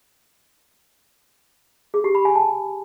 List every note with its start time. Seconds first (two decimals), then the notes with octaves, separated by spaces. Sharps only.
1.94 G#4
2.04 G4
2.15 B5
2.25 G#5
2.36 A5